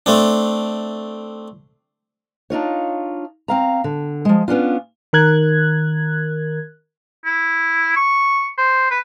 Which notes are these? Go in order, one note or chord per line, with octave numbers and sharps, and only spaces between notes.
A3 C4 D4
D4 D#4 F4 C#5
C4 F5 A#5
D3
F3 G#3
B3 C#4 D4 F4
D#3 A#4 F#6 G#6
E4
C#6
C5
B4